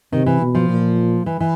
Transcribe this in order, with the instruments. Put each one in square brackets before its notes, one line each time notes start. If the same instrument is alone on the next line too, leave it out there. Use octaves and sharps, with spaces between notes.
[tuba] C3 [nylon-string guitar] D#3
[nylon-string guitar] E3
[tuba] B2
[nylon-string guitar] F3
[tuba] A#2
[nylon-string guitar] E3
E3